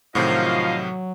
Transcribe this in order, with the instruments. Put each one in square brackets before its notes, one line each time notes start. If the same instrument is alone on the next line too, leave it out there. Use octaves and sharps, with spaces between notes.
[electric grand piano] A2 C3 D#3 [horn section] F3 [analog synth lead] F#3 [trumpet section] D#5 F5